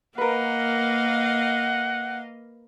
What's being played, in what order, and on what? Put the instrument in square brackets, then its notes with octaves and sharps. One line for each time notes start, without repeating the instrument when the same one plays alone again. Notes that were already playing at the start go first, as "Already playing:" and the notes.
[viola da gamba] A#3 [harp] A#4 B4 [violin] D#5 F5 [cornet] F#5